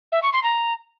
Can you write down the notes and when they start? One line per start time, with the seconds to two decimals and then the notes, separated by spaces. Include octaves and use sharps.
0.12 E5
0.23 C#6
0.33 C6
0.43 A#5